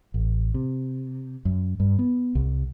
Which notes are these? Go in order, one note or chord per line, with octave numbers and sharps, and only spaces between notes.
A1
C3
F#2
G2
B3
C2